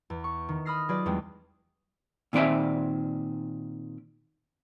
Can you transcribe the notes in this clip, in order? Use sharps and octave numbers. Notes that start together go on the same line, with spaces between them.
E2
C#6
D#3
B5 D#6 F6 A#6 C7
F#3 F4 G#4 B4 D5
E2 G3 G#3 C4
A#2 D#3 C4 D5 E5 G#5